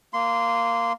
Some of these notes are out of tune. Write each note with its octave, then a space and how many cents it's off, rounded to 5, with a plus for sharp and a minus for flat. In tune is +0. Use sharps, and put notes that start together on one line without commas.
A#3 -10 C6 -15